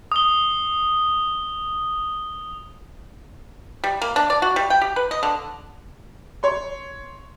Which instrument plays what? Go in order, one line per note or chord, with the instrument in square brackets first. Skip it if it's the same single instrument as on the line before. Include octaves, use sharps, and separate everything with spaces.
[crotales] D#6 G7
[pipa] G3
A#3
D4
D5
F#4
G3
G5
G4
B4
D#5
D3
[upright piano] C#5 C6